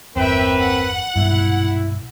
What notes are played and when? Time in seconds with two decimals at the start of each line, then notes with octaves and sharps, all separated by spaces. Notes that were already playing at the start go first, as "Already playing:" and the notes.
0.16 G1 E2 A#3 C4 B4 E5 G5
0.59 F#5
1.16 B1 G2 A#2 E4